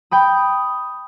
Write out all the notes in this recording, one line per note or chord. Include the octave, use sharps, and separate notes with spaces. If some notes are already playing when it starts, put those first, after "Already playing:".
G5 B5 D#6